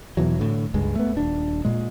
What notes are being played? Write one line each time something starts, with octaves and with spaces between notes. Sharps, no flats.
E2 B2 E3 F#3
A2 D3
C#2 G2 G#3
A3 B3
D#1 D4
A#2 G#3